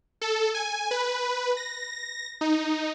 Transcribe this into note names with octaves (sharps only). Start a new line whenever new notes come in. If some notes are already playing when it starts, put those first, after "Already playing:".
A4
G#5
B4
A#6
D#4